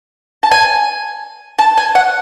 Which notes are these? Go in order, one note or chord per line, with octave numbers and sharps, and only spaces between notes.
A5
G#5
A5
G#5
F#5